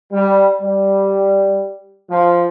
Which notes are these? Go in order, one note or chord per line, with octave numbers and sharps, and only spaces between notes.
G3
G3
F3